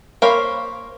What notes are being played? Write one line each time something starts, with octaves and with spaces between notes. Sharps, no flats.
A#3 C5 C#5 F5 B5